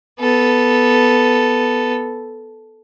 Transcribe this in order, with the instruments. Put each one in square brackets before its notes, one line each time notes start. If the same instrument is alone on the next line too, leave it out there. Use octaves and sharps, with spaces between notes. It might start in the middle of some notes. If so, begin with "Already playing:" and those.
[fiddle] B3 A4